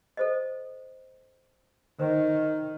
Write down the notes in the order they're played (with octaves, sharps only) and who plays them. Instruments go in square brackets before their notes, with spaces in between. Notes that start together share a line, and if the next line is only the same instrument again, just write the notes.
[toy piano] A4 C5 D#5
[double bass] D#3 [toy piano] C5